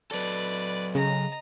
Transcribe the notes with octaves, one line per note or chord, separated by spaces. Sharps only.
F#3 A4 B4 D5
C#3 D#5 A#5